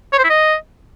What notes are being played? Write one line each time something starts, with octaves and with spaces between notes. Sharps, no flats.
C#5
C5
E4
D#5